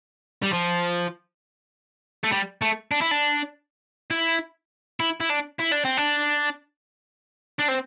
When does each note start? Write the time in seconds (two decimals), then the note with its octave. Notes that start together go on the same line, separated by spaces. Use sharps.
0.43 G3
0.53 F3
2.24 A3
2.32 G3
2.62 A3
2.91 D4
3.01 E4
3.11 D4
4.11 E4
5.00 E4
5.21 E4
5.30 D4
5.60 E4
5.72 D4
5.85 C4
5.97 D4
7.59 D4
7.68 C4